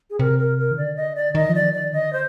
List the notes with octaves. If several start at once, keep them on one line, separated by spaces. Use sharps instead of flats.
G#4
C3 A#4
A#4
A#4
D#3
D3 D5
D#5
D5
D#3 D#5
F3
D5
D#3
D5
D3 D#5
C5